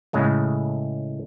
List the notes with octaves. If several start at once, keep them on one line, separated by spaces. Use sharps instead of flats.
A2 C#3 G#3 A3